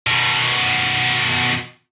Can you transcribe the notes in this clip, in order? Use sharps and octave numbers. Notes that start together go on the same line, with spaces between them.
B2 D#3